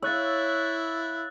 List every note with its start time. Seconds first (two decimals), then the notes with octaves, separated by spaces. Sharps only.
0.03 E4 C#5 F5 E6 F#6 A6